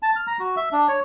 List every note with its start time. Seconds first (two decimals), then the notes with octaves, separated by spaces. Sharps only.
0.02 A5
0.16 F6
0.27 A#5
0.40 F#4
0.57 E5
0.72 D4
0.88 C#5